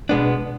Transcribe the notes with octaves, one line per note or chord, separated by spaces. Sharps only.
B2 G#3 B3 D4